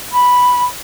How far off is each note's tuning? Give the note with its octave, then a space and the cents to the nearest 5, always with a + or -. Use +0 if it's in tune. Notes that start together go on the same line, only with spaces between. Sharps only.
B5 -5